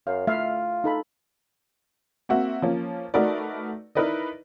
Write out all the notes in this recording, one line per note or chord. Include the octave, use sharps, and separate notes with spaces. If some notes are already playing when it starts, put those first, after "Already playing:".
F#2 F5
A3 F4 E5 F5
D#4 A4 B5
A#3 C4 F#4 E5
F3 A#3 C#4
A3 D#4 F#4 A#4 B4 D5
D#4 E4 A#4 B4 D5 D#5